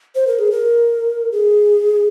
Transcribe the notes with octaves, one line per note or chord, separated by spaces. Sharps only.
C5
A#4
G#4
A#4
G#4